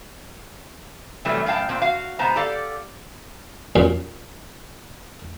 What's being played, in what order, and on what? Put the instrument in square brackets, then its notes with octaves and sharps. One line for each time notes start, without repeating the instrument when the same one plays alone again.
[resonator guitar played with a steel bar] C3 E3 F#3 G3 A3 B3
F#2 A2 F5 G5 A5
A#2 C4
F#4 F5
C3 G#3 B3 C5 A5 A#5
G4 A4 D5 F5
[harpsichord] F#2 A#2